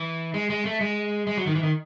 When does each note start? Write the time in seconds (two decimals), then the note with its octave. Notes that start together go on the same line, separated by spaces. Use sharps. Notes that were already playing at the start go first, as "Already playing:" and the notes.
Already playing: E3
0.34 G#3
0.50 G#3
0.65 A3
0.81 G#3
1.27 G#3
1.37 F#3
1.47 D#3
1.55 E3
1.63 D#3